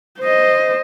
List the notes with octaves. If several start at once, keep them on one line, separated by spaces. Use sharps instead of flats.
C5 D#5